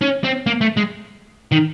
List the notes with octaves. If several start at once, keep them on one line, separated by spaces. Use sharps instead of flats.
C#4
C4
A#3
A3
G#3
D#3